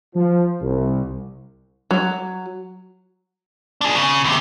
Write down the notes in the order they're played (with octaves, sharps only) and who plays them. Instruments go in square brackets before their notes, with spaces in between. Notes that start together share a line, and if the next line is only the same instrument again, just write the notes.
[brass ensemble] F3
C2
[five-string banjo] F#3
[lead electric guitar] D4 G#4
C#3
D#2 C3